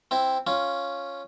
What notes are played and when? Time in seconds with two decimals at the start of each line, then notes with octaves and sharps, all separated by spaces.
0.11 C4 E4
0.47 C#4 F4